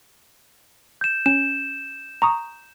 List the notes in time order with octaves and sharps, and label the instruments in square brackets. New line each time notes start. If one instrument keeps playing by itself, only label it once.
[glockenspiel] G6 E7
[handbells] C#4 [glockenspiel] E7
[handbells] A#5 C#6 D#6